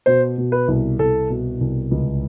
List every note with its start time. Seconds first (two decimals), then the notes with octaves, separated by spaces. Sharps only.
0.06 B2 C5
0.38 B2
0.52 B4
0.68 C2
0.99 C2 A4
1.30 B2
1.61 C2
1.91 C#2